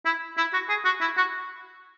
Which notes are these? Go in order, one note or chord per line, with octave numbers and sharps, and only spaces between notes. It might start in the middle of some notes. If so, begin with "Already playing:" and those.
E4
E4
F#4
G#4
F#4
E4
F#4